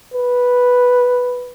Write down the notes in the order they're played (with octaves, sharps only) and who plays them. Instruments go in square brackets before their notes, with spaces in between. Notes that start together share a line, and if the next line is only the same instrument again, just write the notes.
[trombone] B4